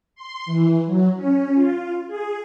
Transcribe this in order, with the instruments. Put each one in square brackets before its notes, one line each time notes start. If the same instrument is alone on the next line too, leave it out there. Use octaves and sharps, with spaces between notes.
[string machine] C6
E3
F#3
C#4
F4
G#4